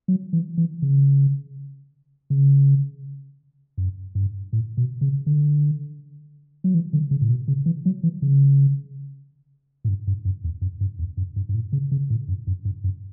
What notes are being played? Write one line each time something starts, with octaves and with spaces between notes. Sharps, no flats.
F#3
E3
E3
C#3
C#3
F#2
G2
A2
B2
C#3
D3
F#3
E3
D3
C#3
A2
B2
C#3
E3
F#3
E3
C#3
A2
G2
G2
F#2
E2
F#2
G2
E2
F#2
G2
G2
A2
C#3
C#3
A2
F#2
F#2
G2
F#2